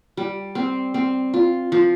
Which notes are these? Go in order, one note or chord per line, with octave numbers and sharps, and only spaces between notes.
G3
C4
C4
F4
F3